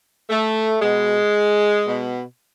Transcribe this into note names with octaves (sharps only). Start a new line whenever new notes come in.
A3
B2 G#3
B2